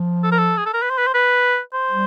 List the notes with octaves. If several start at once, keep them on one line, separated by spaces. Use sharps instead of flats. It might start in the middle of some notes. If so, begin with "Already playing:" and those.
Already playing: F3
A4
A#4
A4
G#4
A4
A#4
B4
C5
B4
C5
B4
C5
G3